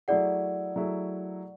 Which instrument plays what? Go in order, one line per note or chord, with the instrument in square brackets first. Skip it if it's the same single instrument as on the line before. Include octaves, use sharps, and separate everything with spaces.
[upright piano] F#3 A3 E4 G#4 [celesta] D5 F#5
[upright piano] F#3 A3 E4 G#4